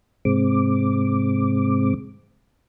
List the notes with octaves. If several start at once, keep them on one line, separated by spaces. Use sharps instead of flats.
G#2 C3 G#3 C4 D6